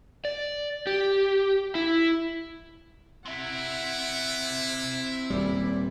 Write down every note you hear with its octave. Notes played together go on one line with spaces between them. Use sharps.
D5
G4
E4
C4 E4 E5 F#5
D#1 A#2 G3 D5 B5